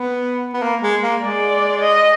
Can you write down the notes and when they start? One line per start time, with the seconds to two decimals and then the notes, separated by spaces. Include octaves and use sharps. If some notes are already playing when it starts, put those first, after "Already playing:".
Already playing: B3
0.53 B3
0.62 A#3
0.82 G#3
1.02 A#3
1.21 G#3 D5
1.80 D#5